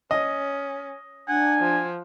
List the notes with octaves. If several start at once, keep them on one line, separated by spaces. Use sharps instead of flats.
C#4 D#5
D4 F#5 G#5
F3